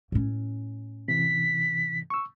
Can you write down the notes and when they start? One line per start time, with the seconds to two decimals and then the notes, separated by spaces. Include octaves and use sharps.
0.12 A2 C#4
1.08 C3 E3 B6
2.10 C#6 E6